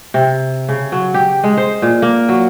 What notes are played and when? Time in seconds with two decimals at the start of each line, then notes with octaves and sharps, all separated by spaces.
0.14 C3
0.69 C#3
0.92 F#3
1.14 G4
1.44 G#3
1.57 C5
1.82 A#2
2.02 A#3
2.29 F#3